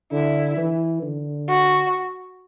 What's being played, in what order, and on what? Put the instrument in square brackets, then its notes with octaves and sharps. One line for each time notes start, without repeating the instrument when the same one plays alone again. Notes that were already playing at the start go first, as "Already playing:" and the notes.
[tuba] D3 [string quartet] E4
[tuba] E3
D3
[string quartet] F#4